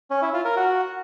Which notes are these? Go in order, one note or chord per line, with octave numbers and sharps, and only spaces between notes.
C#4
E4
F4
A#4
F#4